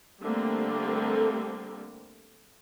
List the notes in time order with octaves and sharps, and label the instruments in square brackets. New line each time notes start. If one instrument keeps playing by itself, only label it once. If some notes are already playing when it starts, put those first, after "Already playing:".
[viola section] D3 G3 A3 A#3 C4